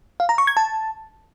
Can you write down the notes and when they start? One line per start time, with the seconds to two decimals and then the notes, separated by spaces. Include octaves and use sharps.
0.20 F5
0.29 A#5
0.38 C#6
0.47 G#6
0.57 A5